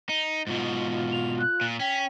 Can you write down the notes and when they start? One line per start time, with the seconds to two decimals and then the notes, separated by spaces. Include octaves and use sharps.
0.09 D#4
0.47 G#2 B2 F4
1.12 F7
1.38 F#6
1.61 A#2
1.80 C#4 G5 B6